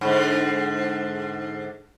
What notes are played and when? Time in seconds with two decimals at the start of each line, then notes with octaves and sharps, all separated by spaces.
0.01 G#2 D3